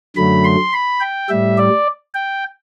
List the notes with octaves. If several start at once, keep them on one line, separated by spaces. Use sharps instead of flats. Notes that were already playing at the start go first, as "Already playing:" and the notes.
F#2 D3 F#3 A3 B5
C6
B5
G5
A2 G3 E5
D5
G5